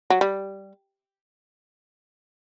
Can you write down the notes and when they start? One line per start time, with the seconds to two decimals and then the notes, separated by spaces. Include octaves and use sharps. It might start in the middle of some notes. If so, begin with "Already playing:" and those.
0.10 F#3
0.21 G3